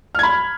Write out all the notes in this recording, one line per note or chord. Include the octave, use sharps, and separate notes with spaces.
B5 F6 G#6